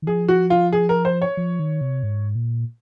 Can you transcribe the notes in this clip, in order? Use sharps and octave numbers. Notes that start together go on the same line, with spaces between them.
D#3
F3 G#4
F#4
F4
G#4
A#4
C5
C#5
F3
D#3
C3
G#2
A#2